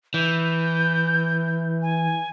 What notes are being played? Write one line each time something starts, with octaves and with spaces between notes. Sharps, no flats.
E3 G6
G#5